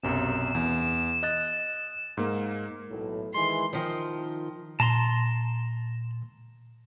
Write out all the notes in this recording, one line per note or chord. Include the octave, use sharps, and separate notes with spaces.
B1 F#2 C3 E7
E2
D#5 F#6 A6
G#2 A#3
B1 A2
D#3 E3 G#3 C6
D#3 F3
A#2 A5 A#5 C6